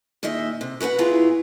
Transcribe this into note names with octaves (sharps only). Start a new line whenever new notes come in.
A#2 D#3 G#4 D#5 E5
C3
F#4 A#4 B4 F#5
B2 E4 F4 G#4 A#5